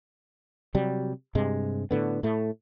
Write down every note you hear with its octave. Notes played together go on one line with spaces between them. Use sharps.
C3 F#3 G3
G2 C3 G#3
A2 D3 B3
A2 A3